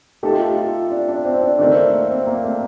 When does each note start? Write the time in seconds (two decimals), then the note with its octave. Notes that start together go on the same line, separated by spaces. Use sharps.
0.23 A3 D#4 G4 A4
0.32 F4
0.42 G4
0.57 F4
0.91 D4
1.09 D4
1.25 C4
1.41 D4
1.58 D#3 A3 C4 D4
1.93 A#3
2.10 C4
2.27 A#3
2.44 A3